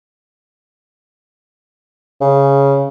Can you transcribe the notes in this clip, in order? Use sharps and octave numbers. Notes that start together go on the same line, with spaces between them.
C#3